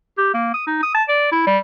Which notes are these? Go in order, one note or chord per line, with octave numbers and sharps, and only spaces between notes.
G4
A#3
D#6
D#4
D#6
A5
D5
E4
G3